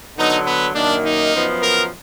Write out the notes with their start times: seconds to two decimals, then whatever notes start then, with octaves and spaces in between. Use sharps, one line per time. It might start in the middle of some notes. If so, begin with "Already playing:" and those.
0.17 D3 F#3 B3 D#4
0.46 B3
0.75 F#2 D#3 A#3 D4
1.04 D#4
1.33 F#2 F3 B3
1.62 A#4